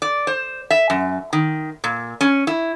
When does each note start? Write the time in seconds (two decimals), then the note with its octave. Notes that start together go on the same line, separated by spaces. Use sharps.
0.02 D5
0.27 C5
0.70 E5
0.90 F#2
1.33 D#3
1.84 A#2
2.21 C#4
2.47 E4